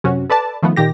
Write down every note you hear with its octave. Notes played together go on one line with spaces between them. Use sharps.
F#2 C3 C#4 F#4
A4 B4 D5 A5
D#3 F3 A3 B3
A#2 D#3 G4 A#6